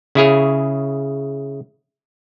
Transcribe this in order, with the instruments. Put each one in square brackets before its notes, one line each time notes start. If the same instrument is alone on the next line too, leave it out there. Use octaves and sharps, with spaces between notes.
[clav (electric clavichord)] C#3 E4 G#4 C#5